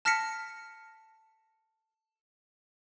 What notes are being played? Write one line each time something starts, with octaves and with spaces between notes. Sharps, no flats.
A5 F6 A#6 B6 C#7